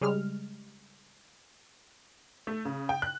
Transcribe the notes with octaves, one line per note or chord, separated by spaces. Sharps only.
C#3 G3 G#3 F6
A3
C#3
G5
F#6